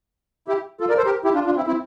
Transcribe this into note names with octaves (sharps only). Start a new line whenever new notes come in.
E4 G4
F4 A4
A#4 D5
A4 C5
G4 A#4
E4 G4
D4 F4
D4 F4
C4 E4
C4 E4